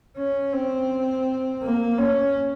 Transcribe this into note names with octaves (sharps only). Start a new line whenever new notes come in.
C#4
C4
A#3
C#4